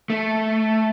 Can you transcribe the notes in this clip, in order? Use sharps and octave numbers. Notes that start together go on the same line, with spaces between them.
A3